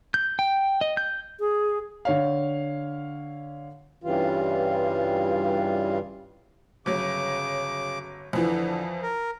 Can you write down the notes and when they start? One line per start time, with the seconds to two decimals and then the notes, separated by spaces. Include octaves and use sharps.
0.14 G6
0.39 G5
0.81 D#5
0.97 G6
1.40 G#4
2.05 D3 C#5 F5
4.04 G2 C#3 E3 G3 F4
6.86 G1 C#3 F#3 D6
8.33 F2 D3 E3 F3
9.03 A#4